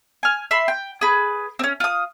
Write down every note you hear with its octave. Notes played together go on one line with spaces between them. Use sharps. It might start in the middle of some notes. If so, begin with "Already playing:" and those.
G#5 F6
E5 B5 C6
G5
G#4 B4
C4 C#4
F4 D#6